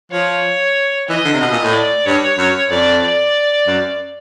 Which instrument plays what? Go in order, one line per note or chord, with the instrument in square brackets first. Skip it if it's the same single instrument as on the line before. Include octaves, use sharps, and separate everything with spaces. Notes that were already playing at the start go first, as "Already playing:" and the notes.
[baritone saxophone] F3 [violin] C#5
[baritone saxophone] E3 [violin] D#5
[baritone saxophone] D3
C3
[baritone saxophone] B2 [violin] D#5
[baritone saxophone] A#2
A2
[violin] D5
[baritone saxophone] G2 [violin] C#5
[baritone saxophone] F#2
[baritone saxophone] F2 [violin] D5
[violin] D5
[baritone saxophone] F#2